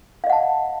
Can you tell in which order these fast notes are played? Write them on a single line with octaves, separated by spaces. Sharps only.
F5 D#5 F#5 A5